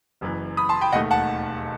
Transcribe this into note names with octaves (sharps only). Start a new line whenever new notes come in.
F#1 F#2 E3
B5 D#6
A5 C6
G5 B5
E1 D#2 D#3 A3 D#4 D#5 F#5
F#5 A5